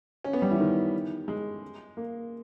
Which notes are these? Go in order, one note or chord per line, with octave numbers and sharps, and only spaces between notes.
C#4
B3
G3
E3
D#3
G#3
A#3